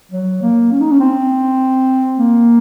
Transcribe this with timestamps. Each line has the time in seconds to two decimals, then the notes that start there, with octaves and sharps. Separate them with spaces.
0.12 F#3
0.42 A#3
0.72 C#4
0.81 D#4
0.92 C#4
1.00 C4
2.19 A#3